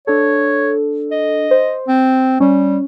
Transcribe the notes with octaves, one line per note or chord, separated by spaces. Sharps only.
D4 A4 C#5
D#5
C5
C4
G3 C#4